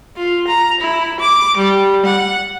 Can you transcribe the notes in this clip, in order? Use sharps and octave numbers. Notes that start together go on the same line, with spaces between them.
F4
A#5
E4
D6
G3
F#5